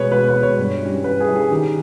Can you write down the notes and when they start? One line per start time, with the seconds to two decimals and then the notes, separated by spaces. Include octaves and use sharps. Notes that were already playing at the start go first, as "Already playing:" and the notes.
Already playing: B2 G#3 B3 B4 C#5
0.12 B2 B4
0.28 B4
0.35 G#3 B3
0.43 C#5
0.58 G2
0.82 G3 C#4 E4
1.04 G2 B4
1.20 G#4
1.28 G3 C#4 E4
1.36 G#4
1.51 D#3 G4